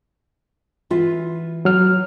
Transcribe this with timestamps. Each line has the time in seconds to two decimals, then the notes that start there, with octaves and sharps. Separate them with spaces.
0.90 E3 F4 E5
1.65 F#3 F6